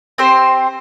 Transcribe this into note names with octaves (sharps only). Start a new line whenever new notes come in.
C4 G4 C5